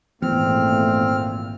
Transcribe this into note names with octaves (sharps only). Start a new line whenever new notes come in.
G#1 E2 A#2 A3 C4 F6